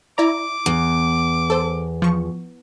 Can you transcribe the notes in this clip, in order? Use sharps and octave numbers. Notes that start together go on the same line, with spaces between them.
E4 D5 A#5 D6
E2
A4 C5
F3 C#6